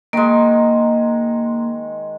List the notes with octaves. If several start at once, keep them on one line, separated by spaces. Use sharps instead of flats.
D#3 G#3 A#3